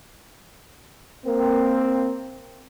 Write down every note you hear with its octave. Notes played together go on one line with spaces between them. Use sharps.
A#3 C4